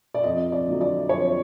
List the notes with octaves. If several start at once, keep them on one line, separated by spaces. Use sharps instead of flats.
D5
F2 D#5
D5
D3 F#3
D5
F2 C#5